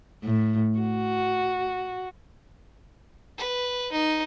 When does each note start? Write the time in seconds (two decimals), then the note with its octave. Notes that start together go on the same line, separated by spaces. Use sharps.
0.24 A2
0.79 F#4
3.38 B4
3.92 D#4